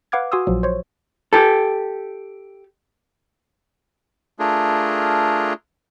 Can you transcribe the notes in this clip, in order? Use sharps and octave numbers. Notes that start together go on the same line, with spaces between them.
B4 F5 F#5 D6 F6 G#6
F#4 G#5 C6 D#6 E6
A#1 F3 F#3
C5 C#5
G4 A4
A3 D4 F4 G#4 A#4